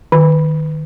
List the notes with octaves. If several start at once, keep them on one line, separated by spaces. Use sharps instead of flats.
D#3